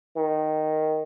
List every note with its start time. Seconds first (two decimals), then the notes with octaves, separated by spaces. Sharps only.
0.17 D#3